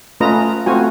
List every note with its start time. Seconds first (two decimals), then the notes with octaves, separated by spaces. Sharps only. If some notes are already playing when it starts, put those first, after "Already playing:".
0.20 A3 C#4 F4 B4 D#5 A#5
0.66 A3 C4 F4 F#4 G#5